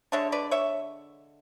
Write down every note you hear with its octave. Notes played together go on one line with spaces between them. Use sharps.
D3 G#3 D4 C#5 E5
B4 D5
C#5 E5